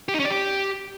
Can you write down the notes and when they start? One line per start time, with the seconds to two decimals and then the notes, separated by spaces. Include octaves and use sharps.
0.08 G4
0.14 D#4
0.20 C#4
0.25 D5
0.31 G4